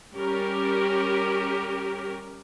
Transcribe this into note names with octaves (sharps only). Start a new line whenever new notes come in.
G3 C#4 G4 A#4